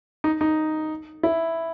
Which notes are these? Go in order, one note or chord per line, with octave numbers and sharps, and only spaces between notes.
D#4
D#4
E4